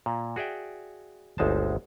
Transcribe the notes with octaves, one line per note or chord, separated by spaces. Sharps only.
A#2
F#4 G#4 D5 E5 G5
G1 D2 G#3 D#4 C5 A5